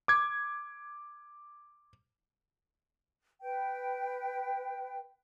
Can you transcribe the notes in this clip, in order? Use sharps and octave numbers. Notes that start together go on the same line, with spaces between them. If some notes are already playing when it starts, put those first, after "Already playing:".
D6 G#6
B4 G5